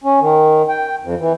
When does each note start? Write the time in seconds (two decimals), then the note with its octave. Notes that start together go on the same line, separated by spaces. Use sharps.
0.04 C#4
0.20 D#3
0.69 G5
1.03 F2
1.19 E3